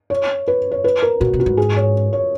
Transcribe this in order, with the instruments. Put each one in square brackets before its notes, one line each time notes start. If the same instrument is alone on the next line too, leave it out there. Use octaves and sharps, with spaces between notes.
[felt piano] C#5
B4
C#5
B4
A#4
[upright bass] A#2 [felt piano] F#4
[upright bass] B2
[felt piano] F#4
[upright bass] G#2
[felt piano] G#4
C#5
C#5